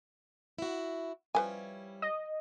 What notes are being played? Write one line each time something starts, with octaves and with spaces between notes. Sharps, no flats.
E4 F#4
F3 G3 C#4 E4 B4 G#5
D#5